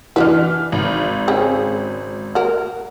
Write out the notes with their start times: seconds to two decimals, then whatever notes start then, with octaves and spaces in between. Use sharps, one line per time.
0.16 E3 D4 F#4 B4 F6
0.72 G#1
1.28 C#3 C4 G#4
2.35 F#4 A#4